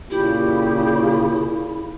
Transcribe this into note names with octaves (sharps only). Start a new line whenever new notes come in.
A#2 C#3 E4 G4